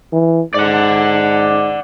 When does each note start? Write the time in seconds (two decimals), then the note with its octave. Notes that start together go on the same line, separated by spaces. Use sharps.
0.13 E3
0.54 G#2 D5 F#5